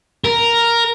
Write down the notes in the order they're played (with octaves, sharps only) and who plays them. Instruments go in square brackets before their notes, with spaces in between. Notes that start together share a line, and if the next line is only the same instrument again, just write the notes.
[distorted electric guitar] A#4